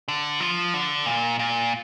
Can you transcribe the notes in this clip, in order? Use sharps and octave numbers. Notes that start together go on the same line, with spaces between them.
D3
F3
D3
A#2
A#2